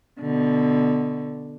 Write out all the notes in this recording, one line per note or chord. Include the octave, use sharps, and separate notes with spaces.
B2 D3